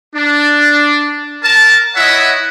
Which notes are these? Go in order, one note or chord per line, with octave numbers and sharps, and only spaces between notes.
D4
A#4 A5
E4 C#5 D#5 E5 F#5